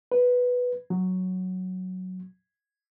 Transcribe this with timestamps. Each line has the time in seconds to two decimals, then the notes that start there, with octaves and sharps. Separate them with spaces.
0.12 B4
0.90 F#3